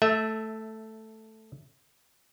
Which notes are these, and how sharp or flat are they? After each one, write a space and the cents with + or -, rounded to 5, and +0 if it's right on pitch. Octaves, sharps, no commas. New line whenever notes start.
A3 +0 E5 -15